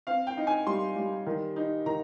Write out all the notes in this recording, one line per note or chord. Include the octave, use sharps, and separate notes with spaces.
C4 F5
G5
D#4
G#5
G3 C6
G3
D#3
D#4
D#3 A#5